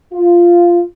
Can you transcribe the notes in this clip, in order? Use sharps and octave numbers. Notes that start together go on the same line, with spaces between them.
F4